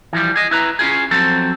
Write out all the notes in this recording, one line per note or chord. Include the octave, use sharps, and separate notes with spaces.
E3 F3 G3
G#4 D#5
E4 B4 A#5
C#4 D#4 F4 G#4
F3 F#3 C4 A4